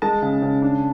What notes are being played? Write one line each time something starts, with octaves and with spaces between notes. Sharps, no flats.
G#3 A5
C#3
C#3
D4